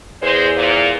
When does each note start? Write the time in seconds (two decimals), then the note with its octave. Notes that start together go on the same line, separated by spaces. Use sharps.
0.22 E2 G#3 C5
0.57 A#2